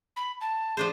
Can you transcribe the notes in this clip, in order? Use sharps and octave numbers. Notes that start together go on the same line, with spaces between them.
B5
A5
F3 D4 G#4 C5